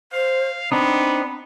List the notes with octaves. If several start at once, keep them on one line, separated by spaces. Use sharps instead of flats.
C5 F5
B3 C4 D4 D#4 B5